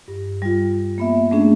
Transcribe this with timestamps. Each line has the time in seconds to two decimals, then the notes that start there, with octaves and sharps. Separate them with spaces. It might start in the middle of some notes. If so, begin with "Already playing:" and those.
0.08 G2
0.42 G3 F4
0.98 A#3 B3 E5
1.31 A3 A#3 C#4 D4 G#4